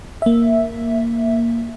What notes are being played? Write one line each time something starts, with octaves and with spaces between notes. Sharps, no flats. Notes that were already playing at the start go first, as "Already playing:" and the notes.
A#3 E5